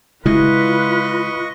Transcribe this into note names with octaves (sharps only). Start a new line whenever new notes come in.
C#3 G#3 E4 F4 B4 D#5 C#6